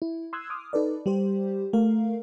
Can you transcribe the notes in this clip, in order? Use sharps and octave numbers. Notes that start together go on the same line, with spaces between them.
E4
C6 D#6 E6 F#6 G#6
D6 D#6 F6
D#4 A4 B4 D5
G3 G4 C5
A3 A#4 F5